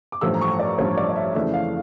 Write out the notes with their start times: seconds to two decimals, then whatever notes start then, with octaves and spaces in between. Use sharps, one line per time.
0.12 D6
0.21 A1 G2 F3 A3 E6
0.34 A#5
0.41 C#6
0.59 D5
0.78 A1 G2 F3 A3 C#5
0.97 D5
1.09 D5
1.16 E5
1.35 F2 C#3 E3 A3 D4 E5
1.54 F5